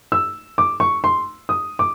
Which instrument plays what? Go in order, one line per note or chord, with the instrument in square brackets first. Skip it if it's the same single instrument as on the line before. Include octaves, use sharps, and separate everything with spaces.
[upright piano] E6
D6
C#6
C6
D#6
D6